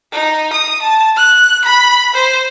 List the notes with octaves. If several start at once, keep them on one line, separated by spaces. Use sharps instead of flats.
D#4
D#6
A5
F#6
B5
C5